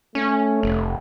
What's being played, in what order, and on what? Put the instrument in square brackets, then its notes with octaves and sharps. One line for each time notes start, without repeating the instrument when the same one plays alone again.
[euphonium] A3 [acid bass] C#4
[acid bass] F1